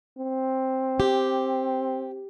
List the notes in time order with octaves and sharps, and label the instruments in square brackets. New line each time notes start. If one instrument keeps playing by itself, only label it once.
[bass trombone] C4
[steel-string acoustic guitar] G4